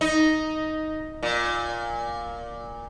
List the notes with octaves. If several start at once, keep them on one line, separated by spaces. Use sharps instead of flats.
D#4
A#2